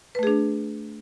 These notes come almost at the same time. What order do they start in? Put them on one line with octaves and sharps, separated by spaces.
B4 A3 G#4 D4